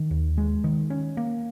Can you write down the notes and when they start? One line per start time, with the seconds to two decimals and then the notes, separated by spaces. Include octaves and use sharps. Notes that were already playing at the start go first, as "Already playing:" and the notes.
Already playing: D#3
0.11 D#2
0.38 G#3
0.64 D#3
0.90 C#4
1.17 A#3